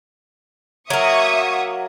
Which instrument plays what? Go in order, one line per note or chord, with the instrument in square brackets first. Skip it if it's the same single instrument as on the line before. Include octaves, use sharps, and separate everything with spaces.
[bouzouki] F#3 A#3 [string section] E5 C#6 D#6 [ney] F#5